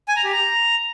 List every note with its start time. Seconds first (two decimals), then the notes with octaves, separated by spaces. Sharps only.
0.08 G#5
0.16 A#5
0.24 G4
0.32 A#5